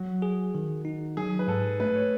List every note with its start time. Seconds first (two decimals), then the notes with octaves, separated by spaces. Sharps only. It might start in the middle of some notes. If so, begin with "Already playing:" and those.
Already playing: F#3 F#4
0.22 G#4
0.55 D#3
0.85 D#4
1.17 F#3 G#4
1.39 B4
1.48 G#2 A4
1.80 A3 B4
1.95 C#5